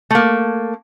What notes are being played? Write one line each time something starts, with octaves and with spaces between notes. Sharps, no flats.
A3 A#3